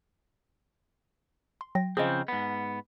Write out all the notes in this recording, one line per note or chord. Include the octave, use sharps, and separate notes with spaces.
C6
F#3 G5 A#6
C#3 F3 C4 G#4 D#5
G#2 B3